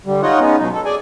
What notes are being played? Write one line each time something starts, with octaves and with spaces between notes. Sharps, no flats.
D3 G3
D#4 F4 C#5 D#5 F#5
G#3 B3 C#4 D#4
B2 F#3 D#4
A4
G#4 D5 G#5